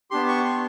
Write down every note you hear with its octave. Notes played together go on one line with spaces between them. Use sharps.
B3 D4 G4 C6
C#6
C6